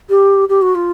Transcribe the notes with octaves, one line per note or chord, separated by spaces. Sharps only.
G4
G4
F#4
F4